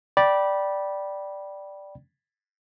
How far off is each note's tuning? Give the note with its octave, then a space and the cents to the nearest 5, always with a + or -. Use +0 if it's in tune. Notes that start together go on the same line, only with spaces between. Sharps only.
D5 +0 G5 -15 B5 -20